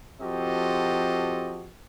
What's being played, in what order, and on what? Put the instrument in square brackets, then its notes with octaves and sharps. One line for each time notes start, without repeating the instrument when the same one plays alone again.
[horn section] F3 C4 F#4 G4 A4 D#5